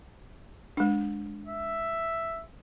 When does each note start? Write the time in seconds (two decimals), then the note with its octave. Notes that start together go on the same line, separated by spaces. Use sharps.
0.77 G#3 D4
1.47 E5